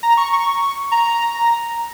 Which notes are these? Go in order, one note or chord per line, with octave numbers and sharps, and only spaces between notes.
A#5
C#6
C#6
A#5